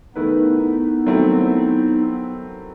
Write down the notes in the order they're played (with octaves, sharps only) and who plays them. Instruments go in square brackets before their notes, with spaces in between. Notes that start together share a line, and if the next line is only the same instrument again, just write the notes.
[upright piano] D#3 A3 E4 B4 [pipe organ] B3 D#4
[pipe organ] B3 D#4
[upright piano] D#3 F#3 A3 C4 E4